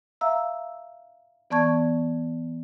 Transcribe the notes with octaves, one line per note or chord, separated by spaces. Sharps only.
E5 F5 A#5 E6
E3 B3 D5 A5 C#6 G#6